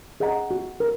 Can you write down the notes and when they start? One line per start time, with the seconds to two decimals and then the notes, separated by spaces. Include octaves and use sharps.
0.20 G#4 D#5 F#5 A#5
0.51 F#4
0.80 A#4